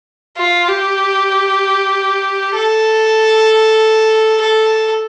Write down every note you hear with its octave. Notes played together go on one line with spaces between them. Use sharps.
F4
G4
A4
A4